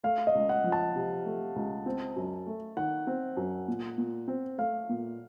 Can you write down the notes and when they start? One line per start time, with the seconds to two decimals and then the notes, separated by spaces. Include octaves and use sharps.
0.03 A3 F5
0.27 D#5
0.35 C#2
0.49 F#5
0.64 F3
0.72 A5
0.96 C3
1.25 A3
1.56 C#2
1.86 C4
2.16 F#2
2.46 A3
2.77 D#3 F#5
3.07 C4
3.37 F#2
3.68 A#2
3.98 A#2
4.28 C4
4.58 A3 F5
4.89 A#2